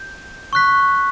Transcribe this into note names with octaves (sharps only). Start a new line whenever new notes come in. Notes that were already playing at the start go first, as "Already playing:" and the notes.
Already playing: G6
C#6 F#6 B6